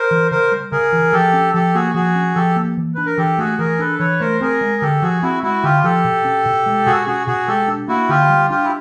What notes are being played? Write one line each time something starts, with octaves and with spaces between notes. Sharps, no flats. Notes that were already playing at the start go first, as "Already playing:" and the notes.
Already playing: A#4 C5
E3
C#3 A#4 C5
G3
C#3 G#4 A#4
E3
F3 G4 A4
C#4
F3 G4 A4
A#3 F#4 G#4
F3 F#4 G#4
C#4
F3 G4 A4
A#3
E3
D4 B4
A#4
E3 G4 A4
A3 F#4 G#4
E3 G#4 A#4
D4 A4 B4
E3 B4 C#5
A3 A#4 C5
C4 G#4 A#4
G#3
D3 G4 A4
F3 F#4 G#4
C4 E4 F#4
G#3 E4 F#4
D3 F4 G4
F3 G4 A4
B2
C#4
B2
G#3
B2 F#4 G#4
C#4 F#4 G#4
B2 F#4 G#4
G#3 G4 A4
D4
A#3 E4 F#4
D3 F4 G4
G3
D4 F4 G4
E4